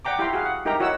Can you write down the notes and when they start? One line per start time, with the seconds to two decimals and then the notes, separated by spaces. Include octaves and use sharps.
0.05 D5 F#5 G5 A#5 D6
0.19 E4 G4 F5 G5 A#5 C6
0.33 F#4 G#4 F5
0.45 F#5
0.65 D#4 G4 A#4 E5 G5 A#5
0.80 E4 F#4 C#5 D#5 F#5 E6